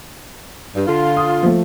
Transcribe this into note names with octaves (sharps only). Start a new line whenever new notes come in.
G2
D3 F4
D#6
F3 A3